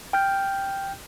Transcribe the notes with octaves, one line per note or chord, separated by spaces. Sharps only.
G5 F6 G6